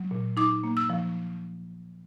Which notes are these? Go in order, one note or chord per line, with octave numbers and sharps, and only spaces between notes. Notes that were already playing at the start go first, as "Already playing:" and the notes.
Already playing: F#3
A#2
D#4 D6
A#3
E6
F3